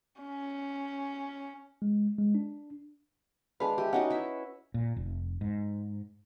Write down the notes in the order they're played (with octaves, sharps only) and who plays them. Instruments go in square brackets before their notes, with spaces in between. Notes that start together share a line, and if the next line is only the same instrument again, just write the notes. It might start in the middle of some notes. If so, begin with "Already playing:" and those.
[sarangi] C#4
[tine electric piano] G#3
G#3
D4
[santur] G#3 B4 [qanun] D4 F5
[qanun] G4 [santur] E5 G5 G#5
[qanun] C#4 D#4 F#4 [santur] F#5
[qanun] E4 E5
[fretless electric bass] A#2
F1
G#2